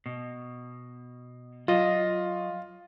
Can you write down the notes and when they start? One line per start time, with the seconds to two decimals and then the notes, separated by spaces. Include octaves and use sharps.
0.06 B2
1.68 F#3 F4 D#5